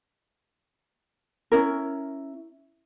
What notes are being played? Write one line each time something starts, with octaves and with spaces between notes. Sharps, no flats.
C#4 E4 A#4